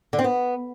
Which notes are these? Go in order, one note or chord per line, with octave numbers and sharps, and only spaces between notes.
D3
C4
B3